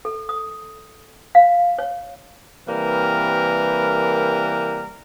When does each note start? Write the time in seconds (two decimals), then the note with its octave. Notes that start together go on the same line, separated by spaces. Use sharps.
0.05 A4
0.29 D#6
1.35 F5
1.78 C#5
2.68 C3 E3 G3 A#3 A#4 B4